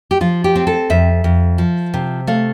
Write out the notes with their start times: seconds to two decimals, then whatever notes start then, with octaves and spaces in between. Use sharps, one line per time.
0.11 G4
0.21 F3 F4
0.44 G4
0.55 C4
0.67 A4
0.90 F2 E5
1.24 F2
1.58 F3
1.94 C3
2.27 A3 F5